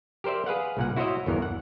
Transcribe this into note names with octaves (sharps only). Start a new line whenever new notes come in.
G4 A#4 C5 D5 E5
G#4 B4 F5 F#5
C2 A#2 F#5
E4 F#4 C5 C#5 D#5 E5
G1 E2 E3 A#4
F#5